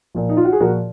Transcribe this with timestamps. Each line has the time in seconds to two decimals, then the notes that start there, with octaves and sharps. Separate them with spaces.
0.15 A#2 F3
0.29 D#4
0.37 F4
0.45 F#4
0.52 G#4
0.60 A#2 F3 F#4 A#4